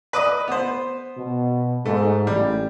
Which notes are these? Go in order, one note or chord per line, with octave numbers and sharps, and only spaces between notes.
B4 D5 D#5
B3 C5
B2
G#2 A3
A1 G3